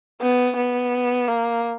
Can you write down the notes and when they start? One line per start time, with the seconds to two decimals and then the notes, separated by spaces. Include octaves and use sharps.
0.22 B3
0.57 B3
1.28 A#3